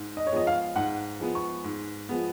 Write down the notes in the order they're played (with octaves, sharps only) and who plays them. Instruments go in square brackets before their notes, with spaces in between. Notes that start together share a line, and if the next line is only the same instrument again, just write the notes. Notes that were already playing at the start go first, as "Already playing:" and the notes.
Already playing: [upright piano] G#2
[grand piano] D#5
C#5
[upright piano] F3 G#3 B3 [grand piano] D#5
[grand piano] F5
[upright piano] G#2 [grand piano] F#5
[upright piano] F3 G#3 B3
[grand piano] C#6
[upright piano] G#2
F3 G#3 B3